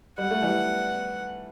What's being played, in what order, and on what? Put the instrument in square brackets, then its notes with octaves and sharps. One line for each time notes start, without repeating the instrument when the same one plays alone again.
[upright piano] G3 [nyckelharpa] F#5
[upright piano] A3
E3 G3